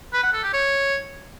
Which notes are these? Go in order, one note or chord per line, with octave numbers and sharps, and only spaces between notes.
B4
F#5
A4
G4
C#5